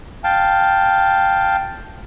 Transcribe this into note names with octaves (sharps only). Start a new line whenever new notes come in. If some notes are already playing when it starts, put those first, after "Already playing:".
F5 G5 A5